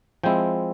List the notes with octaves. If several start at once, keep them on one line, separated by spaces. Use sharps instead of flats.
F3 G#3 C4 E4 G5